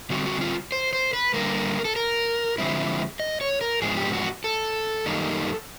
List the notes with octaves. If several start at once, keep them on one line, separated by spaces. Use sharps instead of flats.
D3 G3 C4 F#4
F#4
F4
C5
C5
B4
D3 G3 A#3 A#4
A4
A#4
D3 F3 G#3 C4 E4
D#5
C#5
A#4
G#2 F3 G#3 B3 D4 G#4
G4
F#4
A4
F#2 D#3 G3 A#3 D#4